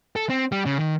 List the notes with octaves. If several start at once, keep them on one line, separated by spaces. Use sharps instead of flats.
A4
C4
G3
C#3
D#3